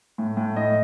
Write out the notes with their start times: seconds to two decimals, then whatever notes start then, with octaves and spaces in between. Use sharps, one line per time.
0.18 A2
0.37 A2
0.56 A2 D#5